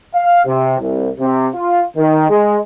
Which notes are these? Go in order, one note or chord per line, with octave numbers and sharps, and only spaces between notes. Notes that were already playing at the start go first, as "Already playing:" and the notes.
F5
C3
C2
C3
F4
D#3
G#3